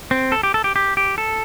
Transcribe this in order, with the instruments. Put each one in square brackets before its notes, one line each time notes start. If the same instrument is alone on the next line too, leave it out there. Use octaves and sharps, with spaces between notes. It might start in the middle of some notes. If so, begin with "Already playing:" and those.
[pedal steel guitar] C4
A4
G4
A4
G4
G4
G4
A4